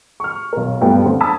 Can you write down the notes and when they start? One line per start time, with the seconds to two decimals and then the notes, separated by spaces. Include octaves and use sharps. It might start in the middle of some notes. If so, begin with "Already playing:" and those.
0.20 C#6 F6
0.53 B1 A#4
0.81 G2 A3 B3 G5
1.06 D3 C4
1.21 A5 B5 D#6 E6 G#6 B6